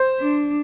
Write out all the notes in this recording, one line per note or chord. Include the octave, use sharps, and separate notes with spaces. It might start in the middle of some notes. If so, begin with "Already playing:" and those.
Already playing: C5
D4